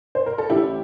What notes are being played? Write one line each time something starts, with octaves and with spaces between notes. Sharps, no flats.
C5
A#4
A4
A1 E4 G4